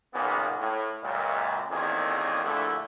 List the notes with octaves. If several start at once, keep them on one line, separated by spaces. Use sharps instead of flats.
B1 A#2 C#3 A#3 B3
A2
C#2 F#2 A#2
A1 E2 A#2 D#3 C4 G#4
A#1 A#2 D3 F3 A3 E4